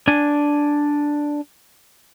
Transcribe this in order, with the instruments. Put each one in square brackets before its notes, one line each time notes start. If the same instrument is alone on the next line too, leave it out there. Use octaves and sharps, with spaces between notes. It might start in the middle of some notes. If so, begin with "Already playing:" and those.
[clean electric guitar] D4 G#5